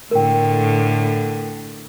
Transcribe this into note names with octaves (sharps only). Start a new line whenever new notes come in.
A2 D3 A#4 G5